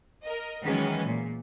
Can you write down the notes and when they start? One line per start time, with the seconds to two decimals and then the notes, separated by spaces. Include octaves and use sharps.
0.25 A#4 D#5
0.64 D#3 E3 F#3 G#3 B3 C#4
1.05 A#2